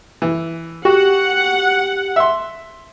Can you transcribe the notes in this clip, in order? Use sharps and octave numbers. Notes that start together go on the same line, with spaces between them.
E3
F#4 G4 F#5
E5 C6